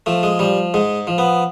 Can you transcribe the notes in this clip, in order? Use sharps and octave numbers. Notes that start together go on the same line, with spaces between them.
F3 A3
G#3
F3 G3
G#2 G#3
F3
B3